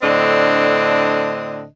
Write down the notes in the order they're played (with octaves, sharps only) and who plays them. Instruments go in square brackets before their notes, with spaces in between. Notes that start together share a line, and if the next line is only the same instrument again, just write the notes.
[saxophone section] A2 D3 C4 D4 D#5